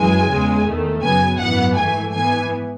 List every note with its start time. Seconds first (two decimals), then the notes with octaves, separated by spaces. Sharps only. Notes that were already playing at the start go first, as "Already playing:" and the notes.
Already playing: F#2 E3 G#3 G#5
0.28 E2 C#3 G#3
0.65 E2 D#3 A3
1.02 F#2 C#3 F#3 B3 G#5
1.39 G#1 F#2 E3 B3 F#5
1.75 G#2 E3 A3 G#5
2.13 G#2 E3 B3 G#5